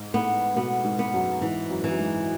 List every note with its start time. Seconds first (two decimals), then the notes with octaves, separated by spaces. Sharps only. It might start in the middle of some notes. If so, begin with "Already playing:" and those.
Already playing: G#2
0.14 A2 B3
0.56 B2 B3
0.84 G#2
0.99 B3
1.14 F#2
1.41 G#2 E3
1.70 F#2
1.84 E3
1.90 F#2
1.99 G#2